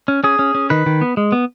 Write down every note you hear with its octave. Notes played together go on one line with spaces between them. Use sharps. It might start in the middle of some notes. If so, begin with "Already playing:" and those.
C#4
C#4 G#4
C#4
C#4
D#3 B4
D#3
B3
G#3
B3